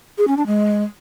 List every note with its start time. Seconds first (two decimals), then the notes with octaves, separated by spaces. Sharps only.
0.18 G#4
0.28 C#4
0.37 D4
0.47 G#3